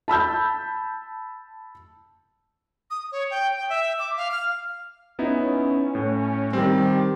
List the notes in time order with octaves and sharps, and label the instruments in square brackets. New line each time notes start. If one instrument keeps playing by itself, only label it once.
[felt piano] A5 B5 E6 G6
[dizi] D#6
C#5
G5
G5
E5
D6
F5
F6
[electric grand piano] B3 D#4 E4 [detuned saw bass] C#4
[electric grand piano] A2
[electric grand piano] D#3 C4 [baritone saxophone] G3